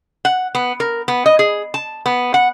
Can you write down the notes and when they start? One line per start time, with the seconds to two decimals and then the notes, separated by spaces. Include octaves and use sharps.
0.25 F#5
0.55 B3
0.80 A#4
1.08 B3
1.26 D#5
1.39 G#4
1.74 A5
2.06 B3
2.34 F#5